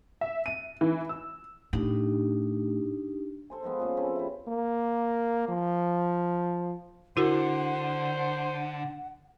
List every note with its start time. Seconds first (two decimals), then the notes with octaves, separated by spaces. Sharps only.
0.21 E5
0.46 D#7
0.81 E3
1.09 E6
1.73 A2 D4 D#4 G4
3.50 A4 C5 G#5
3.63 D#3 F3 G#3 B3
3.80 A#3 C#4 F4 G#4
3.97 C4 C#4 A4 B4
4.16 C3 E4
4.48 A#3
5.48 F3
7.17 D3 E4 F#4 A#4 C5 F#5